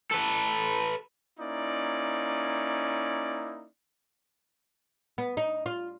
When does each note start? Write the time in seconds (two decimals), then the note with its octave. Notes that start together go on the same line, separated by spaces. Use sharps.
0.12 A4 B4
1.39 A#3 C#4 D#4 E4 D5
5.18 B3
5.37 D#4
5.66 F4